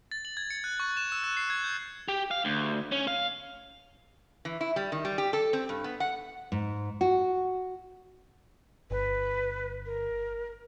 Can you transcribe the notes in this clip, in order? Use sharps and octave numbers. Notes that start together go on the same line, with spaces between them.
A6
F#7
G#6
C#7
F#6
C#6
E7
E6
F#6
C7
G#6
G6
G4
F5
D2
C#4
F5
E3
E4
G3
D#3
G3
G4
A4
C4
G2
B3
F#5
G#2
F#4
G1 B4
A#4